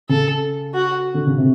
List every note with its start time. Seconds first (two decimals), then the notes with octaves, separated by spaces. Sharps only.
0.09 C#3 A4
0.74 F#4
1.14 D3
1.27 C#3
1.38 C3